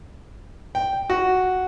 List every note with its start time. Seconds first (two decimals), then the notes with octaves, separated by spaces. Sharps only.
0.75 G5
1.10 F#4